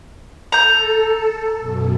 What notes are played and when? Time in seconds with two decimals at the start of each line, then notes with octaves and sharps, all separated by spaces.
0.52 A4 A#5 G6
1.60 F#2 B2